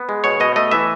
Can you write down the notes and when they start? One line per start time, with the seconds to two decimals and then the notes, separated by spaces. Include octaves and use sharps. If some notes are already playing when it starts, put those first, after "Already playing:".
Already playing: B3
0.09 G#3
0.24 B2 C#5
0.40 B2 D#5
0.56 A3 D#5
0.71 E3 E5